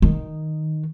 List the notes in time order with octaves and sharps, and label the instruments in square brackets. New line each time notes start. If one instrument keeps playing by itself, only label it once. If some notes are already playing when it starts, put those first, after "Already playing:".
[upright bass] D#3